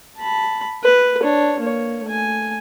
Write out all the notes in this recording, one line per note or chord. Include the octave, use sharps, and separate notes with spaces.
A5 B5
B4
D4 C#5
A#3 C#5
A3 G#5